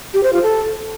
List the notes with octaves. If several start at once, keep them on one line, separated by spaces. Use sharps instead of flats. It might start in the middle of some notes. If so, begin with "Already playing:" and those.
G4
C5
F4
A4